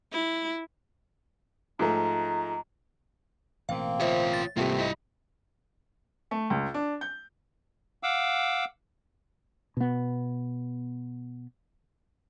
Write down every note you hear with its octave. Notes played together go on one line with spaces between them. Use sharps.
E4
G#2 F3 A3 A#5
A1 B2 A#3 C4 F5
F4 C5 C#5 E5
A6
C2 G#2 C3 A3 A#3 C4 F4 G4
E4 D#5
A3
C#2
D4
G6
F5 F#5 D6 E6
B2 B3